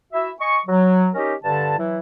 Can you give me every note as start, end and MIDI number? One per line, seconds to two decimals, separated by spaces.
0.13 0.30 64
0.13 0.30 66
0.13 0.30 76
0.40 0.58 75
0.40 0.58 80
0.40 0.58 85
0.66 1.08 54
1.14 1.33 61
1.14 1.33 63
1.14 1.33 67
1.14 1.33 70
1.14 1.33 75
1.43 1.74 43
1.43 1.74 50
1.43 1.74 81
1.77 1.99 52
1.77 1.99 54
1.77 1.99 64